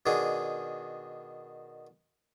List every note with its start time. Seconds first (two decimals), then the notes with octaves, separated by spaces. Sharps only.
0.06 B2 D#3 D4 G#4